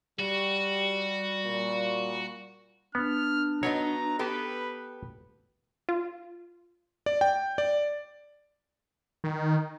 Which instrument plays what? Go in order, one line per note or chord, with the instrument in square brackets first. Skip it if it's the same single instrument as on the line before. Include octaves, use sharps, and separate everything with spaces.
[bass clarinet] G3 [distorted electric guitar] F#4 [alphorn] G4
[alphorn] A#2
[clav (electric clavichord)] B3 [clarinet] D4 [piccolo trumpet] F6
[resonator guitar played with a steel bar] F#3 B3 D#4 [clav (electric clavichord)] C#5 [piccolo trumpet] A#5
[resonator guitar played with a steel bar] B3 G4 A4 [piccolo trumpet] B4
[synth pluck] F4
[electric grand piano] D5
G5
D5
[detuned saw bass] D#3